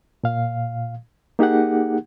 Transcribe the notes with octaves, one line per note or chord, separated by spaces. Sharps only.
A#2 F5
A#3 D#4 G4 G#4 F#5